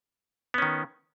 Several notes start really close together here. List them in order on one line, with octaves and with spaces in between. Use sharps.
B3 C#4 D#3